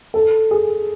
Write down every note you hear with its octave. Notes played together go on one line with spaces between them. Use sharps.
A4
G#4